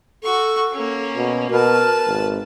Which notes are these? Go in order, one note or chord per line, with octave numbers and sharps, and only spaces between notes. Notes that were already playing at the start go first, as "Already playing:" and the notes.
F#4 A4 C#6
A#3 C#4
B2
B2 A#4 B4 A5
G#1